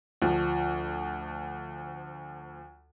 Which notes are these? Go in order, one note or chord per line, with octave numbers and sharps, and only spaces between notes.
D2 F3